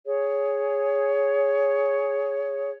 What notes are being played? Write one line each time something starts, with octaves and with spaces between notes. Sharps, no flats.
G#4 C#5